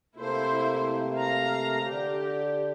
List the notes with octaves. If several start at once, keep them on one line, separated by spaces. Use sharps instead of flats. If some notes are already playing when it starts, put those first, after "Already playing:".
C3 A3 A#3 E4 C5
F5 A#5
D3 G4